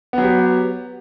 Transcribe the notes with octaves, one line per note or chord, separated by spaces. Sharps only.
F#3 B3 G4